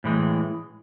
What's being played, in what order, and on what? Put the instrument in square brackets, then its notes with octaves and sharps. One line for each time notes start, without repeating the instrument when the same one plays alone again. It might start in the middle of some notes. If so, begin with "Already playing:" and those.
[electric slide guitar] A2 E3 G#3